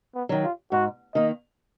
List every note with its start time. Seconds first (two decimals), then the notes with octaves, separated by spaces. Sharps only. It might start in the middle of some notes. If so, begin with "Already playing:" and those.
0.15 B3
0.29 D#3 F#3
0.44 F4
0.72 G#2 F#4
1.15 D#3 A#3 D#5